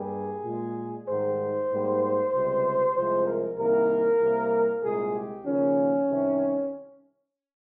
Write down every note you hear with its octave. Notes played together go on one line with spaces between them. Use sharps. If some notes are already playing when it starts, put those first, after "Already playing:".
Already playing: G2 G3 A#3 G#4
A#2 G#3
G#2 D#3 G3 C5
G#2 G3 A#3
C#2 C3 G3
C2 C3 F3 G#3 C5
A#4
C2 C3 D#3 A#3 A#4
C2 C3 G3 A#3
C2 A#2 G#3 G#4
G4
D#2 C#3 F3 A#3 C#4
C2 C3 D#3